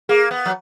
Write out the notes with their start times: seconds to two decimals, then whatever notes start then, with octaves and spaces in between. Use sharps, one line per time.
0.09 A#3 G#4
0.31 B3
0.46 F#3